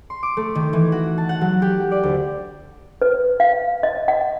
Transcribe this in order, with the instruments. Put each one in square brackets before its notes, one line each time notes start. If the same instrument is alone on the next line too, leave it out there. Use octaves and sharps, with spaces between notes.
[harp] C6
D6
A3
D#3
E3
F#4
A5
F#5
F#3
G4
D5
D2
[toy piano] B4
F5
D#5
F#5